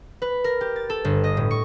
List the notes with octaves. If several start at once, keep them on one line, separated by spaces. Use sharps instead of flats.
B4
A#4
G4
A6
A4
G1
D#5
A2
C#6